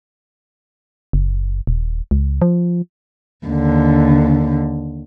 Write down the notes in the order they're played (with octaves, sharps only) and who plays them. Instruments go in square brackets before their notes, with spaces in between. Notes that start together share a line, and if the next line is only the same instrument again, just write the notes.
[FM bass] F#1
D#1
C#2
F3
[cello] D#2 D3